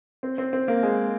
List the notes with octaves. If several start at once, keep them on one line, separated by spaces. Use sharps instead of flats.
C4
C4
C4
A#3
G#3